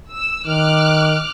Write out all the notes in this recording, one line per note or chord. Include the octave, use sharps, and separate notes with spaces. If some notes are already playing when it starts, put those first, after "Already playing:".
E6
D#3 D6 F6 F#6